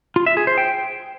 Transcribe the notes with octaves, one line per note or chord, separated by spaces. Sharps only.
F4
E5
G#4
C5
G5